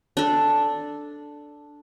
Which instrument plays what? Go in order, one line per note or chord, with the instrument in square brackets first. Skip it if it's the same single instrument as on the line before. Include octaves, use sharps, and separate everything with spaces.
[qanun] D4 A4